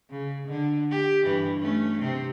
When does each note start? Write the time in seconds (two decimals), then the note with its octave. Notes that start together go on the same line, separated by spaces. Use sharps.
0.10 C#3
0.48 D3
0.91 G4
1.26 G2 E3
1.61 A3 C#4
2.00 C3 C4